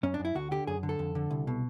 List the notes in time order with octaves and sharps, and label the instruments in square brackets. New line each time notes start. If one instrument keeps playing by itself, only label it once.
[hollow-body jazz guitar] F#2 C#4
D4
F#2
E4
D2 F#4
D3 G4
F#2 G#4
D3
A4
F2
D3
C2
B2